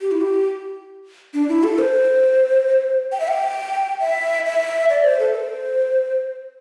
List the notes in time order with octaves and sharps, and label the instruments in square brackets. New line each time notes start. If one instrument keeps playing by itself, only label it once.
[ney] G4
E4
G4
D4
E4
A4
C5
G5
E5
G5
E5
E5
D5
C5
A4
C5